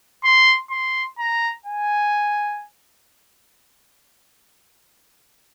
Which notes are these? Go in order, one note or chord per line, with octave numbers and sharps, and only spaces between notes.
C6
C6
A#5
G#5